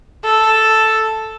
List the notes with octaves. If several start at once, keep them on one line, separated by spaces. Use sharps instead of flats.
A4